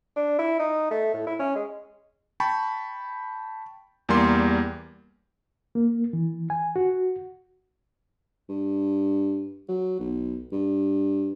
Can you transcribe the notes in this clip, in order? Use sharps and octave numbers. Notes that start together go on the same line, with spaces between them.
D4
E4
D#4
A3
A2
E4
C#4
G#3
G5 A5 B5 C#6
E2 G3 A#3 C6
A#3
E3
G#5
F#4
G2
F#3
B1
G2